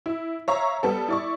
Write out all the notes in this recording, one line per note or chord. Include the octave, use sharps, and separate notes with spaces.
E4
C#5 E5 F5 A#5 C#6
G3 B3 A4
E4 D5 C#6